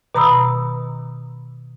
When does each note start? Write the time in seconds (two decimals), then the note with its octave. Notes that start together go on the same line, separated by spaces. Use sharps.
0.15 B2 D#3 A#5 B5 D#6 E6